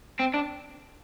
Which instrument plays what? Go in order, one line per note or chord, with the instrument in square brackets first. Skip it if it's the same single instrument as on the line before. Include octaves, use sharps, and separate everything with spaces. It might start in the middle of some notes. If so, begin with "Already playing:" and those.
[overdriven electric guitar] C4
D4